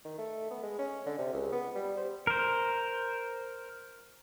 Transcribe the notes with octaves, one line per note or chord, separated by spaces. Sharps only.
D#3
A3
B3
G#3
C#4
D3
C3
C#2
B3
G3
C5
A#4 C5